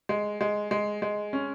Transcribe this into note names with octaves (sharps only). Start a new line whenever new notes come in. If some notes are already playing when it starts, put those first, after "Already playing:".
G#3
G#3
G#3
G#3
C#4